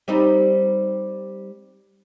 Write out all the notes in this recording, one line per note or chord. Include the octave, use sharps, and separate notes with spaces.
G3 C4 D#4